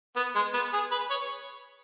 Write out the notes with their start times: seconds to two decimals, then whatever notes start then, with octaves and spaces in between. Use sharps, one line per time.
0.16 B3
0.35 G#3
0.54 B3
0.73 G#4
0.91 B4
1.10 C#5